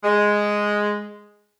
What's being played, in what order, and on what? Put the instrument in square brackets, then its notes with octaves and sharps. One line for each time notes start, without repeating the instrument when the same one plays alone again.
[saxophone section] G#3